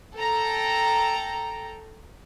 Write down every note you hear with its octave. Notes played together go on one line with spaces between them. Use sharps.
A4 G5 A#5